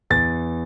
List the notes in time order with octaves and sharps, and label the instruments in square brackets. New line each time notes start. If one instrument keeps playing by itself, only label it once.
[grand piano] E2 A6